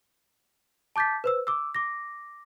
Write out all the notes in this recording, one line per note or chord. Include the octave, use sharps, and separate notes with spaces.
A5 D6 G6 A6 B6
B4 C5 E6
D6 E6
D6 A#6